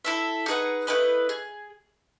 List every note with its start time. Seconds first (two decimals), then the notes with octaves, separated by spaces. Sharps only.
0.05 E4 A4 E5
0.46 D#4 G#4 B4 F#5
0.87 A3 E4 B4 D#5
1.29 G#4